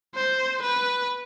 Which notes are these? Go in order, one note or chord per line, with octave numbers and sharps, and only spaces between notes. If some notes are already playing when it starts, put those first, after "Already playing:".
C5
B4